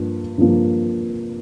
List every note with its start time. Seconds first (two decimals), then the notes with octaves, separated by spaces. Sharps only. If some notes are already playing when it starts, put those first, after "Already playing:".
Already playing: G2 F3 A#3
0.38 G2 F3 A#3